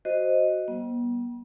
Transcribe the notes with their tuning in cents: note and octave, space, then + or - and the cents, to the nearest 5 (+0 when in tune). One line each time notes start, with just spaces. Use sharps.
F#4 +5 C5 +0 D#5 +0
G3 -35 B3 -45